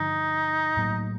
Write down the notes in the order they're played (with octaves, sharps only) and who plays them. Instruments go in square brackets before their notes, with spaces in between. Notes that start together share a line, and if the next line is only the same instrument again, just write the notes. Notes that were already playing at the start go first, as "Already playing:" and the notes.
Already playing: [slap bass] G2 D3 F3 [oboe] D#4
[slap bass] A2 F#3 A#3